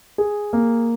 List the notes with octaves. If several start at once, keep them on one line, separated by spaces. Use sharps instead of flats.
G#4
A#3